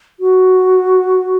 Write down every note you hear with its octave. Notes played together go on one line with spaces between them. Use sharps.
F#4